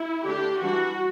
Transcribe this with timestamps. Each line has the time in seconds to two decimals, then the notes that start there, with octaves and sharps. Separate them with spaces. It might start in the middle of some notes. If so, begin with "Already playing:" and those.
Already playing: E4
0.24 D3 A3 D4 G4
0.61 E3 G3 D4 F#4